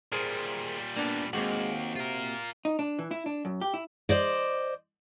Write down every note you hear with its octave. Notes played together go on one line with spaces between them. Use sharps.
A#2 G3 G#4 A#4 C5
A#3 B3 D4
D#2 G#3 A#3 C4 F#4
C3 F4 A#4
D#4
D4
E3
E4
D4
F#2
G4
E4
C5 D5 D#5